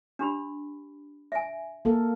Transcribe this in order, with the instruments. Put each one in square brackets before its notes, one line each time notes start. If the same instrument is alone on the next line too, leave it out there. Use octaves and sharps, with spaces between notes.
[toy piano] D4 G4 B5
E5 G#5
[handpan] A#3 A4 A#4